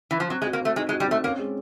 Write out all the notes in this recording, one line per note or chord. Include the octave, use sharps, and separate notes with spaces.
E3
F3
F#3 C4
G#3
F#4
A#3
A3 C4
G#3 D#4
G#3
F#4
G3
A3 C4
A#3 C#4
G#3